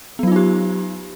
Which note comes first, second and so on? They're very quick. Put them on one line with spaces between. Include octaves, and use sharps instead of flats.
B3 F#3 F4 D#4 G4